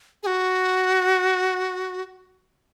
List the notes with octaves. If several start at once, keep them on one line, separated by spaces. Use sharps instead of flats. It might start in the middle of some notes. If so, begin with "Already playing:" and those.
G#4
F#4